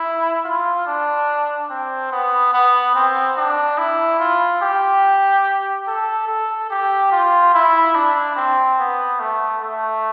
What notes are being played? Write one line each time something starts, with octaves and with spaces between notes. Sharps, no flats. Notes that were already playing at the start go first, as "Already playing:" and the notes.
Already playing: E4
F4
D4
C4
B3
B3
C4
D4
E4
F4
G4
A4
A4
G4
F4
E4
D4
C4
B3
A3
A3